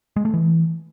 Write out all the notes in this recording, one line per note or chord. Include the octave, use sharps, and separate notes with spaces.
G#3
A3
E3